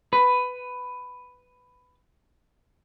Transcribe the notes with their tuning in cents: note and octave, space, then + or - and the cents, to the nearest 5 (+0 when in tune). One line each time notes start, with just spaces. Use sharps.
B4 +10